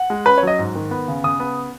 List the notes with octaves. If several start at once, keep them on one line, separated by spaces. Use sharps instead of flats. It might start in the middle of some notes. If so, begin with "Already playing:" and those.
Already playing: F#5
G#3
C#4 B4
C#5
F#3 D#5
G#2
D#3
B3
C#3
C#3 D#6
B3